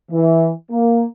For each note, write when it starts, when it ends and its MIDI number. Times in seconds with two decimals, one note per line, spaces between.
0.11 0.51 52
0.71 1.03 58